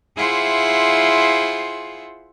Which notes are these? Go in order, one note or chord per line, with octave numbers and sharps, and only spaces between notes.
E4 F4 G#4 C5 E5 F#5